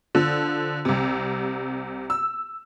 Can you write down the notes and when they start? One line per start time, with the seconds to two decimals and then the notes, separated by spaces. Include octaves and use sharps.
0.15 D3 F3
0.85 C2 C3
2.10 E6